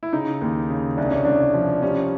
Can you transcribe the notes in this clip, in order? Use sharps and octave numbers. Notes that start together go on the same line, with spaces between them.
E4
C#3 D#4
D#2
C#3
C2 D4
C#4
C2 D4
F3
G3 C#4